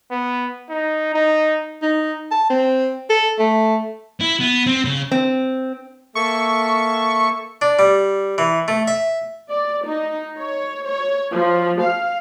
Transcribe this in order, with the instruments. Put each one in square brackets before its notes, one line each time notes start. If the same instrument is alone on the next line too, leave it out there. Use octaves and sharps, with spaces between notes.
[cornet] B3
D#4
D#4
[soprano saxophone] D#4
A5
C4
A4
A3
[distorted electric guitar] E4
B3
C4
C#3
[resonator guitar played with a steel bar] C4
[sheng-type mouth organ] A#3 A4 E5 [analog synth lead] C#6
[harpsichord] D4
G3
E3
A3
E5
[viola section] D5
D#4
C#5
C#5
F3
F5